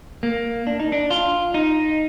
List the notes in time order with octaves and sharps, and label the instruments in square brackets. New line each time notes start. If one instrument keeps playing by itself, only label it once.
[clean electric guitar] A#3
D4
D#4
D4
F4
D#4